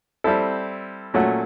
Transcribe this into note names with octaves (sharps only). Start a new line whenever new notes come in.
G3 C4 E4 A4
A#2 F#3 A3 C#4 F#4